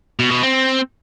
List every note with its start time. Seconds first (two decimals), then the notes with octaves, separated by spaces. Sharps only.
0.19 B2
0.31 B2
0.43 C4